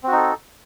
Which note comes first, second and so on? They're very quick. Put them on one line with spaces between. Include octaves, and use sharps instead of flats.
C4 F#4 D#4 A4